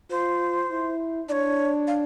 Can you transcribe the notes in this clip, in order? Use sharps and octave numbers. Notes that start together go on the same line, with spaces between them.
F4 C5
E4
D4 C#5 D5
F5